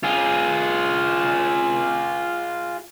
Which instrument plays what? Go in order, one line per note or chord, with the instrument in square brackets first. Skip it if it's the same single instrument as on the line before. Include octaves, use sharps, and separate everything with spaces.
[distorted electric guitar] F4 G#4